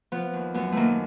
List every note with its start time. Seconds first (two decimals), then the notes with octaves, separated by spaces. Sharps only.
0.12 F3 B3
0.33 D#2
0.54 F#2 B3
0.72 D#3 A3 A#3